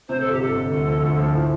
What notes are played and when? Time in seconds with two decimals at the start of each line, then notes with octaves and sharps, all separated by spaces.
0.08 C3 C5
0.20 G1 A4
0.31 G4
0.40 G1 A4
0.56 G1
0.72 D2
0.87 F3
1.02 D2
1.18 F3
1.33 A2